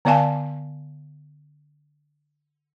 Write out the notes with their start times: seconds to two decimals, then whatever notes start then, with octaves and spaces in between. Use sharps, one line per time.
0.05 D3 B3 D5 F5 G#5 A5